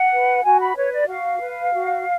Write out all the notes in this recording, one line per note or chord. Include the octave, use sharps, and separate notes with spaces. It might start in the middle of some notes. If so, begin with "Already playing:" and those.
Already playing: F#5
B4
F#4 G#5
B5
B4 C#5
D5
F#4 F5
B4
F#4